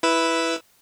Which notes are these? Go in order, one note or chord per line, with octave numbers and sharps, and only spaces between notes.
E4 B4 E6